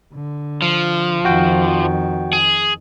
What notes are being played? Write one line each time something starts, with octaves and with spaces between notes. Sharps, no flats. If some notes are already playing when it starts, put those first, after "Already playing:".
D3
F3
F2 D#3 F#4 G5
G#4